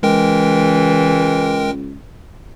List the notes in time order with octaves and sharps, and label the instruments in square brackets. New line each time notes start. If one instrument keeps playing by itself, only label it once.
[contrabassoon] C#2 [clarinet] E3 [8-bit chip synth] G#3 A#4 G5